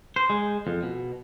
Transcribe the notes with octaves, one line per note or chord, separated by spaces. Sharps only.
C5
G#3
F2
B2